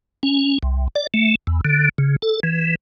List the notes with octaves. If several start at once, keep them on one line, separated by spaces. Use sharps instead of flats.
C#4
C2
D5
A3
E2
D3
C#3
A4
E3